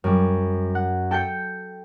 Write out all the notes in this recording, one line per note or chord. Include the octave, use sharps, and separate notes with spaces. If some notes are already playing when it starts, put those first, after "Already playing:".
F#2 G3
F#5
A4 G5 G6 C#7